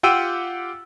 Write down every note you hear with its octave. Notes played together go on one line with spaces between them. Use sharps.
F4 G4 F#5 G5 E6 D#7